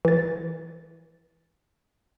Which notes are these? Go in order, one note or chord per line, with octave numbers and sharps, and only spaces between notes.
E3 A6